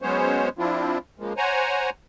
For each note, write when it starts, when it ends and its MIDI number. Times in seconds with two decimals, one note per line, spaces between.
0.02 0.49 54
0.02 0.49 56
0.02 0.49 59
0.02 0.49 61
0.02 0.49 72
0.02 0.49 73
0.59 0.98 53
0.59 0.98 60
0.59 0.98 62
0.59 0.98 64
0.59 0.98 65
1.19 1.33 49
1.19 1.33 53
1.19 1.33 56
1.19 1.33 58
1.37 1.90 72
1.37 1.90 73
1.37 1.90 78
1.37 1.90 80
1.37 1.90 82